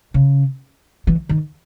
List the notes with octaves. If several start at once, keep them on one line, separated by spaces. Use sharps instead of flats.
C#3
E3
D#3